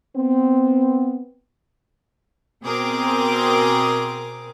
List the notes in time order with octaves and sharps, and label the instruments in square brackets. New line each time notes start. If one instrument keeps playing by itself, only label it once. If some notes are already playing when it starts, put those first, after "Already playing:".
[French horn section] B3 C4
[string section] B2 C4 G#4 A#4 D6